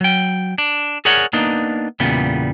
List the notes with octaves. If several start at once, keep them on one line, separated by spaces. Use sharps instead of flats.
F#3 G5
D4
G#4 A#4 C#5 D5 F#5
A#3 B3 D4 D#4
E2 A#2 C#3 G3 B3